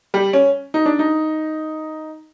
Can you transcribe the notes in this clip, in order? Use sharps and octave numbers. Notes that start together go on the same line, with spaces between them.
G3
C#4
D#4
D4
D#4